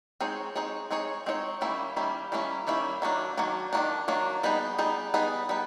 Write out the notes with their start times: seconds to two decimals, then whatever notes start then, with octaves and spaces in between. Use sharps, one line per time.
0.20 G#3 C4 D#4 G#4 C#5
0.55 G#3 C4 D#4 G#4 C#5
0.90 G#3 C4 D#4 G#4 C#5
1.26 G#3 C4 D#4 G#4 C#5
1.61 D#3 G3 A#3 C#4 E4
1.96 D#3 G3 A#3 C#4 E4
2.32 D#3 G3 A#3 C#4 E4
2.67 D#3 G3 A#3 C#4 E4
3.02 D#3 F#3 A#3 D4
3.37 D#3 F#3 A#3 D4
3.73 D#3 F#3 A#3 D4
4.08 D#3 F#3 A#3 D4
4.43 G3 B3 D#4 G#4
4.78 G3 B3 D#4 G#4
5.14 G3 B3 D#4 G#4
5.49 G3 B3 D#4